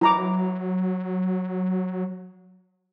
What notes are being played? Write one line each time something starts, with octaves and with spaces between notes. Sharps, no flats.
F#3 E4 A#5 D6